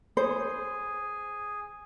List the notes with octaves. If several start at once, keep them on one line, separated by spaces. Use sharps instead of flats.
G#4 C5